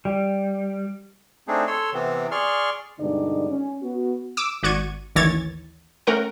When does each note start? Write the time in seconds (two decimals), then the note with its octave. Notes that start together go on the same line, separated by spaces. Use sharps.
0.05 G3
1.48 A3 C4 D4 D#4 G#4
1.67 A4 C#5 C6 E6
1.93 C3 E3 B3 C4
2.31 G#4 D5 C6 C#6 F6
2.99 G2 B2 D3 G#3 D#4 D5
3.50 C#4
3.82 B3 F#4
4.37 D6 E6
4.63 G#1 F#4 D5 C#6 G#6 D#7
5.15 A1 D#2 E3 C#5 G#6 A6
6.07 A3 C#4 A#4 F#5 G5